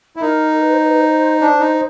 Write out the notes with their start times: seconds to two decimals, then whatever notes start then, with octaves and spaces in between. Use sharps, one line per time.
0.16 E4
0.21 D#4 A#4
0.61 B4
0.73 C5
0.85 B4
1.01 C5
1.41 D4 C5
1.60 D#4